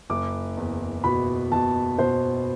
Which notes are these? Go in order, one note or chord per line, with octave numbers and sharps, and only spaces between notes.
F#1 D6
E2
B2 B5
B2 A5
B2 C5